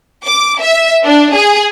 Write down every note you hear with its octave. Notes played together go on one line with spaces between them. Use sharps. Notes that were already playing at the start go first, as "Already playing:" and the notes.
D6
E5
D4
G#4